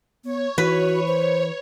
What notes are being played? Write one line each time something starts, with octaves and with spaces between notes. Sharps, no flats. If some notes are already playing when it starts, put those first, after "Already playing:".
B3 C#5
E3 F#4 B4
C5